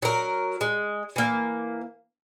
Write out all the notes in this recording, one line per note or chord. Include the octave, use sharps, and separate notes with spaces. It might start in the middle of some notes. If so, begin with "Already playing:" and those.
F#3 A#4
G#3
E3 A#3